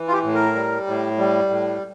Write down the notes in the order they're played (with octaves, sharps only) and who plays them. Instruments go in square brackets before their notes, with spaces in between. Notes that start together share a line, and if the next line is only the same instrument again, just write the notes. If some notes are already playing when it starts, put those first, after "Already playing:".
Already playing: [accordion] E3
F4
G4
A2
A#4
G3
A2
G3
A2